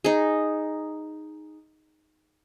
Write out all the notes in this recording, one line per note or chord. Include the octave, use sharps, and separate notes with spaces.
D#4 G#4